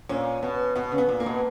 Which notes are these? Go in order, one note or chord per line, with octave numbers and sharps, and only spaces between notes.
A#2 C#4
B2 B3
B2 B3
C#3
B3
A#2
A#3
B2